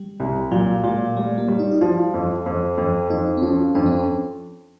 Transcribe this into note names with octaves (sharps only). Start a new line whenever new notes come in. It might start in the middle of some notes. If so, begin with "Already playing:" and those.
Already playing: G3
C2
A#2 F#3
A#2 G#3
G3 A3
A#3
G3
D#4
F4
F3 E4
F2
F2
F2
F2 D#4
C4
F3 C#4
F2 D4
C4
C#4